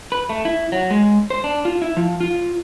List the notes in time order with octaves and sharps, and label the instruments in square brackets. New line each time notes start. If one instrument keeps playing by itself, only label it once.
[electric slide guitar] B4
A3
E4
F#3
G#3
C5
D4
F4
E4
F3
F4